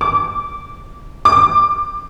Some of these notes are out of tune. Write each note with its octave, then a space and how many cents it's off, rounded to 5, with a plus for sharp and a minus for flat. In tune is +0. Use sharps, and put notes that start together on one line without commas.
D6 -15
D6 +15